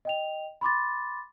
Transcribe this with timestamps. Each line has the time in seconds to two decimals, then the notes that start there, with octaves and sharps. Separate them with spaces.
0.05 D#5 G5 F7
0.61 B5 C6 D6 A6